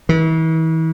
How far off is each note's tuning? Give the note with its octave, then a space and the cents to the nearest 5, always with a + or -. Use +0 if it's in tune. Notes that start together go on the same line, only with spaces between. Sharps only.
E3 -40